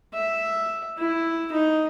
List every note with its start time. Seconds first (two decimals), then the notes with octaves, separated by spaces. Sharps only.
0.14 E5
0.98 E4
1.52 D#4